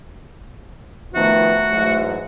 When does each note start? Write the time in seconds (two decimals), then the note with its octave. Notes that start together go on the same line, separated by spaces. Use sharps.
1.15 D#3 F3 A3 B3 F#4 E5
1.71 G#2 E3 F#3